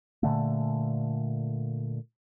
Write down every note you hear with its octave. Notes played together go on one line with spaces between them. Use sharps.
A#2 D3 A3